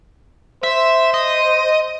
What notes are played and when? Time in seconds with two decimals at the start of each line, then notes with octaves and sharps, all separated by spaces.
0.63 C5 E5
1.14 D#5